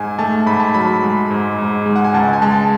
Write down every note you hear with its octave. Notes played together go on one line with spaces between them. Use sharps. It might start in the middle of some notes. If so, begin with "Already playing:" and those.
Already playing: G#2 G#5
A3 A5
G#2 B5
A5
F#3 B5
G#3
G#2
G#2
G#3
F#5
G#5
C#2 A5
G#5
G#3 A5